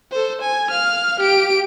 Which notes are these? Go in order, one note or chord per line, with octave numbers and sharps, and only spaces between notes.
A4 C5
G#5
F5 F6
G4 D7